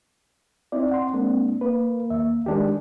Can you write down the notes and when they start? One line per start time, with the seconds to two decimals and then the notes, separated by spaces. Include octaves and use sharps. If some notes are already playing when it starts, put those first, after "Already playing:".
0.72 C4 D#4 E4 D5
0.91 F#5 C6
1.13 G#3 A#3 D4
1.61 A#3 B4
2.10 D#2 E5
2.46 D#3 G#3 D4 G4